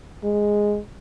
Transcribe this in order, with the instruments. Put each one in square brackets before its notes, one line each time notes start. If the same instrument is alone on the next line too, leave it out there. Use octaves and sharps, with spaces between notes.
[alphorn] G#3